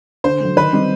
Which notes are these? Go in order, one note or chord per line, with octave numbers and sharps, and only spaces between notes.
D3 C5
F#3 A3
D#3 B4
G3 C4 D#4